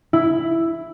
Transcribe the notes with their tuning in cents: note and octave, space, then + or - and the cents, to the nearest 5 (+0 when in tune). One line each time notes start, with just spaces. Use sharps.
E4 +5